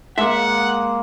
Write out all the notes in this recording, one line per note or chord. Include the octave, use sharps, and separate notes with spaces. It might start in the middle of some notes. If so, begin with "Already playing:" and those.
G#3 A#3 E5 F#5